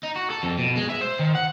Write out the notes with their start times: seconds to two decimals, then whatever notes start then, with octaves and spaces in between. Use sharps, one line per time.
0.03 D#4
0.16 F#4
0.30 A4
0.43 F2
0.58 B2
0.76 G#3
0.90 E5
1.01 C5
1.19 D#3
1.35 F#5